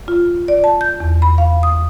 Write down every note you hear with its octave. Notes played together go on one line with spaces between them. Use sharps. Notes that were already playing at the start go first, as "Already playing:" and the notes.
F4
D5
A5
G6
E2
B5
F5
D#6